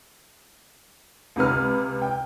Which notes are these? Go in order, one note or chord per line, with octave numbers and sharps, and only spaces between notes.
C#2 C3 B4 F6
G5